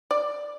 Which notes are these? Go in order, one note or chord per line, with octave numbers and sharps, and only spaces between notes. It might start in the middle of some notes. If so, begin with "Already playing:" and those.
D5